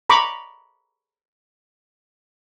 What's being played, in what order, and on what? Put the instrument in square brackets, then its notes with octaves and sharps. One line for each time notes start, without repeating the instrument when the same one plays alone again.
[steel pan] A#5 B5 C#6 D6